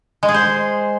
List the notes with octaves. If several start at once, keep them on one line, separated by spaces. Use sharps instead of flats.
G#3
G#4
C5